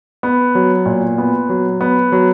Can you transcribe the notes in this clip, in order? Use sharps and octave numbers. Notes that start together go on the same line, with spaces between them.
B3
F#3
A#2
B3
F#3
B3
F#3